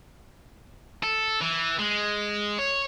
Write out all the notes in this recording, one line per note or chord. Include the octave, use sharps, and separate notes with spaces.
A4
E3
G#3
C#5